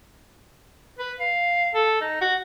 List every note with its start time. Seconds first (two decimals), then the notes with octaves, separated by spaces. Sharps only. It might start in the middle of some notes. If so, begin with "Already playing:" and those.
0.99 B4
1.20 F5
1.74 A4
2.01 D#4
2.21 F#4